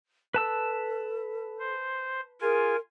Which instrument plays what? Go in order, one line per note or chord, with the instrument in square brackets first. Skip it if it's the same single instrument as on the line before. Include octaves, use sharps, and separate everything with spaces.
[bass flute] A4 [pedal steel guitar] B4 A5 E6
[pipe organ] C5
[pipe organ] F4 G#5 [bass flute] G#4 [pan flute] A#4